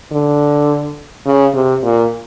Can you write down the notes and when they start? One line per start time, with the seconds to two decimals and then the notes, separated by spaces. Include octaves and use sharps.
0.12 D3
1.26 C#3
1.54 C3
1.83 A#2